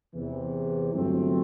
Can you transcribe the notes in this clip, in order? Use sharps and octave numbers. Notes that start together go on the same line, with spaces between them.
E2 C3 E3
G1 G2 F#3 A3 C4